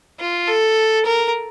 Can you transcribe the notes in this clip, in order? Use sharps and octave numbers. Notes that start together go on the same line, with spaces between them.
F4
A4
A#4